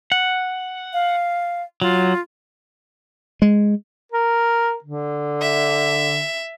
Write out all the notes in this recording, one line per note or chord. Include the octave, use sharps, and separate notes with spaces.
F#5
F5
F#3 F4
G#3
A#4
D3
E5